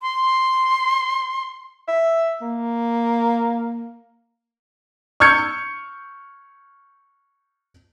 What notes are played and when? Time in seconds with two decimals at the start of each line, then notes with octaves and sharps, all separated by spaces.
0.02 C6
1.88 E5
2.41 A#3
5.20 C#6 E6 F6 G6 G#6 C#7